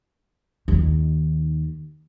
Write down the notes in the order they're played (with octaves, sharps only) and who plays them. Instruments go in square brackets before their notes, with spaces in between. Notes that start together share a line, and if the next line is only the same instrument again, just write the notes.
[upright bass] D#2 D#3